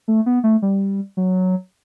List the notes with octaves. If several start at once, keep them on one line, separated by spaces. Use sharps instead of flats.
A3
B3
A3
G3
F#3